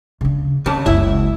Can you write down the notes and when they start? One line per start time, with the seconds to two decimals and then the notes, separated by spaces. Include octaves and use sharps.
0.21 C#3 D4
0.66 C#3 C4 A5
0.86 F#1 C#2 E4 E5